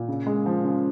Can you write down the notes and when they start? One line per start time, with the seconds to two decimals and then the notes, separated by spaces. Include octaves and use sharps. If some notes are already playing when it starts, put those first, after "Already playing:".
Already playing: A#2
0.08 C#3
0.27 G#3
0.46 F3
0.64 C#3